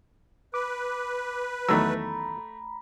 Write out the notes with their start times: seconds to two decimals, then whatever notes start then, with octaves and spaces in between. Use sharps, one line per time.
0.54 B4 D6
1.69 E2 D#3 F#3 A3 A#5 B5 E6